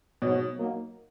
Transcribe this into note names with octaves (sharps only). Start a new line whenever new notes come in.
G#2 B2 F#3 B3 F#4 C#5
F#3 A#3 D#4